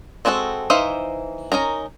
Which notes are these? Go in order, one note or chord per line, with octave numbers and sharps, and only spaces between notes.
G#3 C4 D4 F#4 A4
E3 D#4 C5 E5 F5
C#4 D#4 A#4 A#5